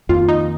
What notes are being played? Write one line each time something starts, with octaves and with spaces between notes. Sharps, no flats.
F2 D#3 A#3 F4
D#4